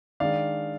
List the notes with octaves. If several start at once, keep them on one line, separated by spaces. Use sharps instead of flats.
D#3 G#3 D4 D5 F5